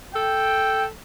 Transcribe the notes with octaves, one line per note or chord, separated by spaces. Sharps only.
A4 G5